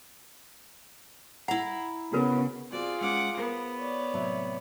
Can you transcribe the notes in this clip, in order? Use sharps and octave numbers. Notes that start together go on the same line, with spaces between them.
E4 F#5 A#5
C#3 B3 F#4 A#4 B4
C4 F4 F#4 G#4 D5
G#3 C#4 F#5 D6
B3 A#4 C5
C#5 D5
A2 C3 F#3